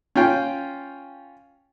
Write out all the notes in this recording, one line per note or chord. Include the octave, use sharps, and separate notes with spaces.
C#4 F4 G5